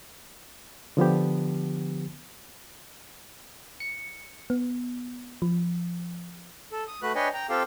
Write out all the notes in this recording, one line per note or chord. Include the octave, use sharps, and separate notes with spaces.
D3 F3 B3 G4
C#7
B3
F3
A4
D#6
A3 F#4 B4 F#6
D4 B4 C#5 D#5 G5 G#5
G5 A#5
C4 F4 G4 A4 F5 G5